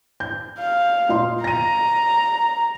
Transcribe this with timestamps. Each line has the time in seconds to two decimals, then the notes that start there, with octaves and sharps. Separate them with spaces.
0.20 G6
0.59 F5
1.09 A#2 D#5 C6
1.44 A#5 A#6 D#7